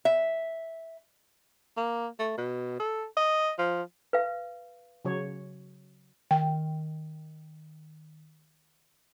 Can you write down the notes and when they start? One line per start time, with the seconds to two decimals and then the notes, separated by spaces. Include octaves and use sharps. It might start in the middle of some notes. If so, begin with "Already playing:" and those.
0.05 E5
1.77 A#3
2.19 A3
2.38 B2
2.80 A4
3.17 D#5
3.59 F3
4.13 B4 F5
5.05 C#3 F#3 C#5
6.31 D#3 G5